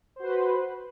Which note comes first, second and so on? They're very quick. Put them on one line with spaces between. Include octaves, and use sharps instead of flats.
C5 F#4 B4